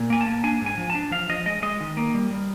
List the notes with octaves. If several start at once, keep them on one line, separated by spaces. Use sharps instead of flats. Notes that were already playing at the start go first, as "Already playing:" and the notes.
Already playing: A#2
A#3 G#5
A5
A#3
D4 G#5
G#2
G#5
F3
A5
D4
F3 F5
F3 D#5
G#3 D#5
G#3 D#5
D#3
A#3
G3
G3